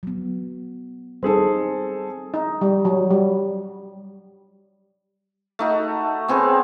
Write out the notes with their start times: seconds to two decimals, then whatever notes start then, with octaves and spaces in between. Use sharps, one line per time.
0.03 F#3 B3
1.23 G3 C4 D#4 G#4 A4
2.34 D#4
2.61 G3
2.85 F#3
3.10 G3
5.59 A3 D#4 F#4
6.28 B3 C4 G#4 C#5